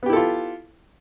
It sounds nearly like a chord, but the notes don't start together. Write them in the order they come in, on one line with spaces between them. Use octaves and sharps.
B3 G4 E4 A4 F4